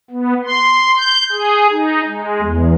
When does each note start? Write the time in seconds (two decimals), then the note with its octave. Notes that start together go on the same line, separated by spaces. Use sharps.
0.11 B3
0.45 C6
0.98 G6
1.32 G#4
1.73 D#4
2.07 G#3
2.42 E2